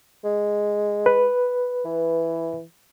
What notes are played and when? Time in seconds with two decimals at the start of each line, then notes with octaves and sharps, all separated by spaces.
0.24 G#3
1.06 B4
1.85 E3